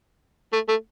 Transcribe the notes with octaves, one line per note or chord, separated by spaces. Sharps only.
A3
A3